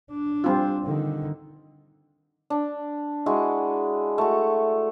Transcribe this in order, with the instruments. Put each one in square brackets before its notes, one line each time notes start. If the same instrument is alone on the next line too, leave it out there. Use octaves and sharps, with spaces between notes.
[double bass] D4
[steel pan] G3 C4 F4
[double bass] D3 D#3
[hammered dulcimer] D4
G#3 E4 F#4
A3 F#4